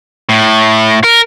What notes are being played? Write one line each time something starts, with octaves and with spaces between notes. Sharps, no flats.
A2
A#4